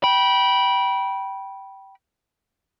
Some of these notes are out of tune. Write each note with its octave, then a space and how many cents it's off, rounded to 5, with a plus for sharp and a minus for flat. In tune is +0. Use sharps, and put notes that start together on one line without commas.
G5 -15 B5 -20